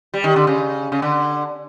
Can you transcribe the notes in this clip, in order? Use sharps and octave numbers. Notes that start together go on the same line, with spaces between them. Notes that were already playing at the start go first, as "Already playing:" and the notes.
G3
D#3
D3
C#3
C#3
D3